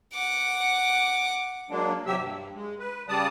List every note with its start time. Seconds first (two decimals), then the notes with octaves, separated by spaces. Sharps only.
0.13 F#5 D6
1.70 F#3 G#3 A#3 D4
2.07 D#2 C3 F#3 G4 E5 E6
2.18 G2
2.55 G#3
2.79 B4
3.09 C#3 G3 D5 A5 D#6